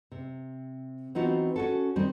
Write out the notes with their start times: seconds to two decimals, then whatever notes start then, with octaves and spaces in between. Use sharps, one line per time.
0.11 C3
1.15 E3 B3 C4 D#4 F4 F#4
1.56 C#4 F#4 A4
1.96 D#3 G3 C4